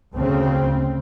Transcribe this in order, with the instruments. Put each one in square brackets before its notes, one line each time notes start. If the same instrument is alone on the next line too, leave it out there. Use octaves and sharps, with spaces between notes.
[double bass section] D2 C#3 C4